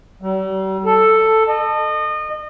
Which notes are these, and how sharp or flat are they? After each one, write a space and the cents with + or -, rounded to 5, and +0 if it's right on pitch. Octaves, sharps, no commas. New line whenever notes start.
G3 -45
A4 +5
D#5 -30